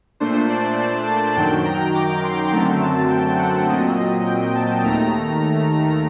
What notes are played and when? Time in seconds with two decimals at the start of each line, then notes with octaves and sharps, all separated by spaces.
0.20 A#2 A3 D4 C5
0.49 D5
0.79 A5
1.07 A5
1.36 F#2 D#3 F#3 G5
1.65 A#5
1.95 D6
2.23 C6
2.52 F#2 D3 F#3 A3 C4
2.81 A5
3.10 G5
3.39 F#5
3.68 A#2 F#3 C4 D#5
3.97 D#5
4.26 G5
4.55 A5
4.84 D#2 D#3 A3 A#5